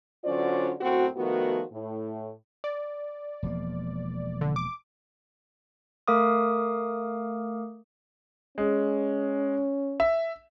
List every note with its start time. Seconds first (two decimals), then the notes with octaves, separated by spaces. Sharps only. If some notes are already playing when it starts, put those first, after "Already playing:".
0.25 D3 F#3 C#4 F4 C5 D5
0.81 F#2 A2 C4 F#4
1.16 D#3 F3 A3 B3 F#4
1.72 A2
2.64 D5
3.43 E1 F3 A#3
4.41 D3
4.56 D6
6.08 A3 A#4 F5 D6 D#6
8.58 G#3 C#4
10.00 E5